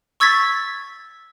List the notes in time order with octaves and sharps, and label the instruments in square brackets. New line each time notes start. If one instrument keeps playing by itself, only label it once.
[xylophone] C#6 E6 G#6 A6 B6